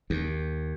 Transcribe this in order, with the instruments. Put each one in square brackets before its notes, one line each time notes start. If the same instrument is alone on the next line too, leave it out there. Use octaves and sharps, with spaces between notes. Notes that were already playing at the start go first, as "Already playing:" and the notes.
[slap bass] D#2